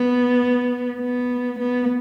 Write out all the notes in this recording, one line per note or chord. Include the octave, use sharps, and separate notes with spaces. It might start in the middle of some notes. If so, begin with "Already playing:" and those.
Already playing: B3
B3
B3